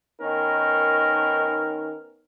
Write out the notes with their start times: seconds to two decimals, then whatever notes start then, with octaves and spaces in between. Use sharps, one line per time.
0.21 D#3 B3 C#4 D#4 A#4